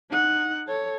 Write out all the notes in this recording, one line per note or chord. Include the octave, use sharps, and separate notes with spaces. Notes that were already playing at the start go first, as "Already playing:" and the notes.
D#4 F#5
A4 C#5